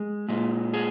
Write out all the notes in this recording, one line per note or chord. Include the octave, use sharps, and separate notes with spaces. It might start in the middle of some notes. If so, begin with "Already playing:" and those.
Already playing: G#3
A#2 G#3
G#4